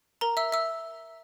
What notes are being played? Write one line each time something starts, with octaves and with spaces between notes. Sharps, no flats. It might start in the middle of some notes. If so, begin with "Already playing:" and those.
A#4 A#5
E5 E6
E5 E6